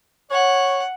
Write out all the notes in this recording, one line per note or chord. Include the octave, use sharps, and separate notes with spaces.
C#5 F#5